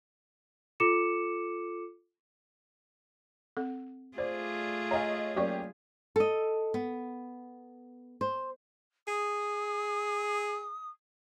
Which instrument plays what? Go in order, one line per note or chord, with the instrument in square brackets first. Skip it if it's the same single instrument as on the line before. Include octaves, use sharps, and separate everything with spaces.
[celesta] F4 A4 D6 C#7 E7
[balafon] C4 A4 F#5
[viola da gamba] A3 F4 G#4 [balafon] C5 [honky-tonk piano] D5
[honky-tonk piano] C#5 D#5 F5 [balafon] G#5 A#5
[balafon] F#3 D5 C#6 [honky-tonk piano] A#3 C#4 G4
[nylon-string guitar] A4 D#5
B3
C5
[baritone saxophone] G#4 [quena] D#6